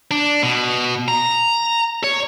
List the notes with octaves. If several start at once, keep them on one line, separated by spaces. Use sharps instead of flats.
D4
B2
A#5
C#5